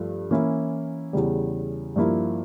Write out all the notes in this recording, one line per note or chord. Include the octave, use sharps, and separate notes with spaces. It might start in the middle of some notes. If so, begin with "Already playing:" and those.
Already playing: G2 F3 A3
E3 A#3 C#4 E4
E2 C#3 G3
G2 F3 A#3 E4